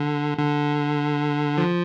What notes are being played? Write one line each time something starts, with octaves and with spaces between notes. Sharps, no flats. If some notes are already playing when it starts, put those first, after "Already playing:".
Already playing: D3
D3
F3